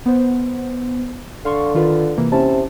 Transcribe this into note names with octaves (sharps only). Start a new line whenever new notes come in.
B3 C5
D3 F5 C6 C#6
D#3 F4 B4
C3 E3 A#3
C3 C#4 E4 A5